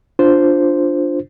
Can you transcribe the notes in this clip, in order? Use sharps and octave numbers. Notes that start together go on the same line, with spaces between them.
D4 F4 C5